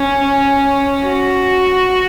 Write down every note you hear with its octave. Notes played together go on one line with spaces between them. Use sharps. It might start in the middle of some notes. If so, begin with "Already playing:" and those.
Already playing: C#4
F#4